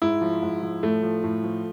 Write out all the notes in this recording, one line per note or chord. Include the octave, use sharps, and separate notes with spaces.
G#2 E4
F3
G#2
F3
A2 A3
F3
A2
F3